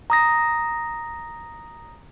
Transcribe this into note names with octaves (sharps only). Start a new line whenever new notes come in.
A#5 D#6 A#6